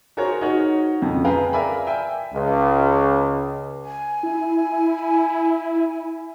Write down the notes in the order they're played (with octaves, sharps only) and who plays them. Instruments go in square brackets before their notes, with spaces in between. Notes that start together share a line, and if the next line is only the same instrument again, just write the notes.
[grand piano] F#4 G#4 A#4 C5 C#5
D#4 F#4 A#4 C#5 F#5
F2 C#3
G#4 B4 F5 G5 A#5
A#4 D5 E5 G#5 B5
E5 G5 G#5
[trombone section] C#2
[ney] G#5
[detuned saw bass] E4